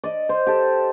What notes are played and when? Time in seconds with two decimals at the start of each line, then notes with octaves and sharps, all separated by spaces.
0.04 D5 D#5
0.29 C5
0.47 G4 A4